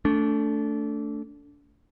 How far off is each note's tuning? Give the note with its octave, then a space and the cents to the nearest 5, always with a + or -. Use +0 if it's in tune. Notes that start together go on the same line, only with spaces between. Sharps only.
A3 +10 D4 -25